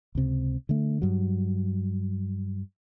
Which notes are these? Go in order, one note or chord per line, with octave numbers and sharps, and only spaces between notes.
C#2 C3
D3 A3
G2 F#3